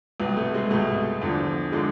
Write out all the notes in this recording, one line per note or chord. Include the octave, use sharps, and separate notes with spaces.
C2 B2 B3
A3
G#3
C2 B2 A3
E2 D3 F3
D3 F3 G#3